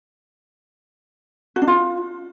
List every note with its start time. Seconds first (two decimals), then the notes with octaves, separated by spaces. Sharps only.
1.56 F#4
1.62 D4
1.68 F4